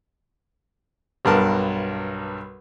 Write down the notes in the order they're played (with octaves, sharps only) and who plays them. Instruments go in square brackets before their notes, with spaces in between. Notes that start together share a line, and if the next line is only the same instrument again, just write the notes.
[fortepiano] B1 G2 A#4 A5